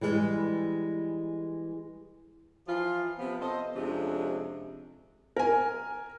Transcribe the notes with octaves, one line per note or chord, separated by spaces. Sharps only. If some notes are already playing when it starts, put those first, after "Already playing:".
E3 G3 G#3
E3 F3 F4
C3 F3 B3
A4 C5 D#5
F2 C3 G#3 C#4 D4
A#4 G#5